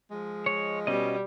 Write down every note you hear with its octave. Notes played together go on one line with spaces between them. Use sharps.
F3 G#3
C#5
B2 G3 C#4 D#5